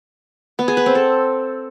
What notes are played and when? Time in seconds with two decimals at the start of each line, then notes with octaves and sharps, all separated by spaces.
0.59 B3
0.68 G#4
0.77 B4
0.86 C4
0.95 A4